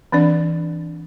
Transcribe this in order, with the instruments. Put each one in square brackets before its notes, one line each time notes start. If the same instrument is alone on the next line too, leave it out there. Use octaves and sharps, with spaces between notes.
[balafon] E3 C4 D4 D5